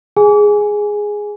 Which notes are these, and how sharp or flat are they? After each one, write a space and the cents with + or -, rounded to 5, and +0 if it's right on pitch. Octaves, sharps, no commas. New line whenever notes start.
G#4 +0 G#5 +0